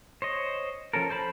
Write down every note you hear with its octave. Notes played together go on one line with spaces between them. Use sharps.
C5 C#5 D#5
F3 C#4 A4 A#4
A4 C5 A5 B5